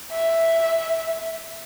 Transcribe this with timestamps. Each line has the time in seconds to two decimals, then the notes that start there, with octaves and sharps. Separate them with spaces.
0.12 E5